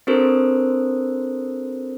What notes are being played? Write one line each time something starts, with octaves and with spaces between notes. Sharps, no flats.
C4 D4 F#4 A4 A#4 C5